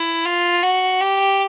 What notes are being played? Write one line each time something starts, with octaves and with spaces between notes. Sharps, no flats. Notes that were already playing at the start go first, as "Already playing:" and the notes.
Already playing: E4
F4
F#4
G4